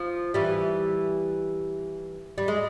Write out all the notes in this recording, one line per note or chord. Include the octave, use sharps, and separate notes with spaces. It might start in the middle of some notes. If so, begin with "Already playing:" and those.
Already playing: F3
E3 G3
G3
G#3